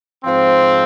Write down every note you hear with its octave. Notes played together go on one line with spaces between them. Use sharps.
G#2 F3 C4